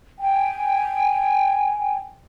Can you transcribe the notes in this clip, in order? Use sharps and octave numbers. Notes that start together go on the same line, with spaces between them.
G5 G#5